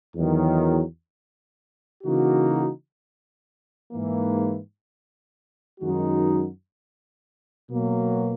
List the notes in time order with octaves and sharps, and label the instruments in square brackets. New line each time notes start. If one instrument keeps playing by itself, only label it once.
[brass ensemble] E2 D#3 F#3
C#3 E3 A#3 D#4 F#4
G#2 E3 A#3
F#2 D#3 G#3 D#4 F#4
B2 F#3 A#3